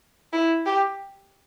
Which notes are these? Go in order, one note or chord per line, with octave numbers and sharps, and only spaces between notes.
E4
G4